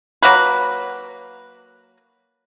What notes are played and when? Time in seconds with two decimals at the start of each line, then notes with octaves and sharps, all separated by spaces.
0.23 F#3 A#3 B4